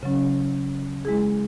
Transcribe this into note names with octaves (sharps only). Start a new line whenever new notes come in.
C#3 F#3 C#4
G#3 E4 G#4